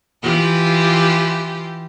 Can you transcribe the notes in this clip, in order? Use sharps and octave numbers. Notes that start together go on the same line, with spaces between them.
E3 F4 G4